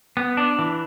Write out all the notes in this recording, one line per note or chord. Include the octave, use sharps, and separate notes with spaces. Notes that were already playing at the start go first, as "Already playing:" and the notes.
B3
D4
E3